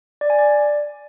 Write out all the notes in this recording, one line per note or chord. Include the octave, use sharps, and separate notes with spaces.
D5
G#5
D5